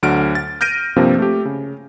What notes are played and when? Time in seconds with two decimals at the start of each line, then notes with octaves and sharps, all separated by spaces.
0.03 D2 D3 F#3 F#5 F6 D7
0.35 A6
0.61 F6 G6 A#6 D7 D#7
0.96 G2 C3 F3 A#3 C4
1.18 A3 G4
1.45 C#3